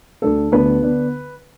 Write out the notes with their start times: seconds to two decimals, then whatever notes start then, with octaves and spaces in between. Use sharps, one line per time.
0.22 D2 D3 A3 D4 A4
0.52 D2 D3 A3 B3 D4 B4
0.82 D3 B3 D4